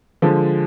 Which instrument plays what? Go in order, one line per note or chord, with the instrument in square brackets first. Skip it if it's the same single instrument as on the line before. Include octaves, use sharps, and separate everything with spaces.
[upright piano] D3 F3 G#3